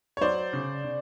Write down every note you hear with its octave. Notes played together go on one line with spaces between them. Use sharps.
C#5
F#3 C5 D5
C#3
C#3